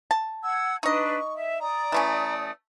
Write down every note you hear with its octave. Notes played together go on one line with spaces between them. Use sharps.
A5
F#5 E6 G#6
D4 D#4 B4 D#5 C#6
E5
D5 A#5 D#6
E3 A3 C#4